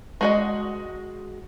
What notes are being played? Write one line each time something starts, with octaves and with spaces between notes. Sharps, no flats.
G#3 F#4 D#5